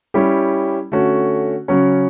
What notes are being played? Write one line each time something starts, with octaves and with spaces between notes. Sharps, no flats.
G3 C#4 E4 G4
D3 A3 C#4 F#4
C#3 F#3 C#4